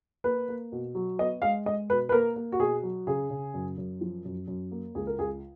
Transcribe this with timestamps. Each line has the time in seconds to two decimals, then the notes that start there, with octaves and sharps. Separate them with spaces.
0.24 A#3 B4
0.49 A#3
0.72 B2
0.95 F#3
1.19 B3 D#5
1.42 G#3 F5
1.66 G#3 D#5
1.89 B2 B4
2.09 B4
2.12 A#3 A#4
2.36 A#3
2.52 F#4
2.59 B2 G#4
2.83 F#3
3.07 C#3 G#4
3.30 C#3
3.54 F#2
3.78 F#2
4.01 F3
4.25 F#2
4.47 F#2
4.71 A#3
4.95 C#2 G#4
5.07 A#4
5.18 C#2 G#4